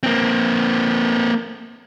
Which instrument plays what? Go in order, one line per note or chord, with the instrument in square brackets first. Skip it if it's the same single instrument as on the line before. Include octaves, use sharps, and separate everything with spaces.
[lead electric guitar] A#3 C4